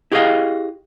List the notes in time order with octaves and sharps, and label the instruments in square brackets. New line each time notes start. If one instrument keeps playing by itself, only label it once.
[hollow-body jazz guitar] E4 G4 G#4 C#5 D#5 F5